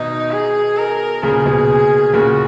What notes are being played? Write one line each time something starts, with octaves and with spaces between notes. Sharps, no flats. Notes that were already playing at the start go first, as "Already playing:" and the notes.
Already playing: B2 D#3 D#4
G#4
A#4
A#2 C#3 G#4
B2
A#2 C#3 F#4